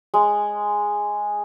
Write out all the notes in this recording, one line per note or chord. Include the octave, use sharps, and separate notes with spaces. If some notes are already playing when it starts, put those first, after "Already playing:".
G#3